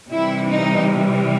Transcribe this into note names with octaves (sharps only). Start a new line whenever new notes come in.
C3 E3 G3 E4
D#4